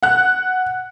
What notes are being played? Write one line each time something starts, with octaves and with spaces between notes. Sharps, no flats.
F#5 F#6